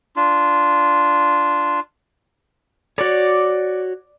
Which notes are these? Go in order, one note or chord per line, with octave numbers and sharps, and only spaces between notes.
D4 F4
F#4 C#5 D5